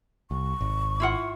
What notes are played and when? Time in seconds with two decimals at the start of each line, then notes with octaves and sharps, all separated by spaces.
0.31 C2 C#6
0.61 G#1
1.00 E4 F4 F#5